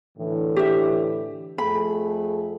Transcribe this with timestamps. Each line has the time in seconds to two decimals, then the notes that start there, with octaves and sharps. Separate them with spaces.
0.18 A2 D3 E3
0.56 G4 E5
1.58 F2 A3 G#4 B5